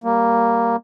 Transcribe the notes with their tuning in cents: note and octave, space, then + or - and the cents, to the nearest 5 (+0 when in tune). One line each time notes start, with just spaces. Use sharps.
G3 +0 A#3 +0